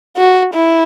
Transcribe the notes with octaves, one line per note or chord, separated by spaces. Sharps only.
F#4
E4